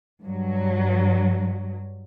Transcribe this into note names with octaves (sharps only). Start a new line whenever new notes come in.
G2 F#3